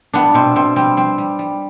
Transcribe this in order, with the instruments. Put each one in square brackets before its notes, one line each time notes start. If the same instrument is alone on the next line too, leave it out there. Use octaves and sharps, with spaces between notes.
[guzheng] G3 B3 D4
B2 C4
B2 C4
G3 C4
G3 C4
G3
G3